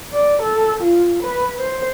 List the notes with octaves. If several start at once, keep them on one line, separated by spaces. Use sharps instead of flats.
D5
A4
F4
B4
C5